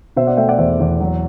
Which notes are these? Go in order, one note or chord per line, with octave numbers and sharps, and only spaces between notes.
B2 C5 E5
D5 F#5
A3 E5 G5
D5 F#5
E2 C5 E5
E2
F#3